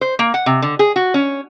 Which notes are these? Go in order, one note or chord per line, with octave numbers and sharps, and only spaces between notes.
C5
A#3
F#5
C3
D3
G#4
F#4
C#4